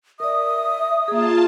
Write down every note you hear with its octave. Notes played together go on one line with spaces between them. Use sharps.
A#4 D5 E5 D#6
A#3 F4 G#4 A5